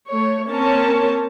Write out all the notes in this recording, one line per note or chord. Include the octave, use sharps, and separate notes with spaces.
A3 C#5
A#3 C4 C#4 A#4 C#5 A5